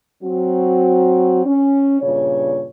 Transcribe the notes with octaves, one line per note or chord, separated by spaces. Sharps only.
F#3 C4 F#4
C#4
G2 A#2 C#3 C#5